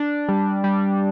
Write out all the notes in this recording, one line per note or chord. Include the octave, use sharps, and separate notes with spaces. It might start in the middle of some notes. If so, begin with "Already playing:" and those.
Already playing: D4
G3
G3